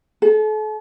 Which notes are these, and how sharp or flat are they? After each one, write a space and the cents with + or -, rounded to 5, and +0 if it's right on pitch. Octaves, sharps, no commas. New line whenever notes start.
A4 -40